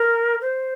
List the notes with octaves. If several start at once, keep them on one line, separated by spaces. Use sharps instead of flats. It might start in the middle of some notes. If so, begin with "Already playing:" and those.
Already playing: A#4
C5